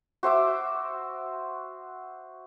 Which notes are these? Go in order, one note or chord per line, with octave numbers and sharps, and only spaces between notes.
F#4 C5 E5 D6